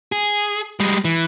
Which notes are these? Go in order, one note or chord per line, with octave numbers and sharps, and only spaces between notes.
G#4
G3 G#3
E3